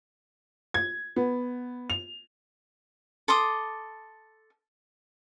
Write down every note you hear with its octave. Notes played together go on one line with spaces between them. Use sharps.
G#6
B3
F7
A4 C6 D6 D#6